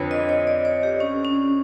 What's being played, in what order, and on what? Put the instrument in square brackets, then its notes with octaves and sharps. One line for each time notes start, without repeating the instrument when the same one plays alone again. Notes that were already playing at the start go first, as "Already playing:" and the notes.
Already playing: [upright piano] F2 D3 F3 [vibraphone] B4 C#5
[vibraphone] D#5
C#5
D5
C#5
G4
C#4
C#4